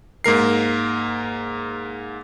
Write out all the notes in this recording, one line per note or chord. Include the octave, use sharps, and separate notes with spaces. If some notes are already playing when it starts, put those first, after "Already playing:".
G#2 A#3 A#4 C7